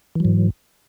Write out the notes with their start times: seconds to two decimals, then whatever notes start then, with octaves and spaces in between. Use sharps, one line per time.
0.15 E3
0.20 F#3
0.25 G#2